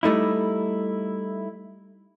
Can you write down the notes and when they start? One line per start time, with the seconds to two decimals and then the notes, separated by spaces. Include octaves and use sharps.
0.03 G3 A3 D#4 E4